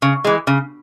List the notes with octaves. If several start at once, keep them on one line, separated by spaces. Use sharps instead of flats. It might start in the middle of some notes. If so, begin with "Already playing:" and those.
C#3
E3 G#3
C#3